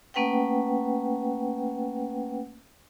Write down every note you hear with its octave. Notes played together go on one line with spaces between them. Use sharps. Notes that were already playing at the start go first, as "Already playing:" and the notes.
A3 A#3 C#4 B4 F#5 G5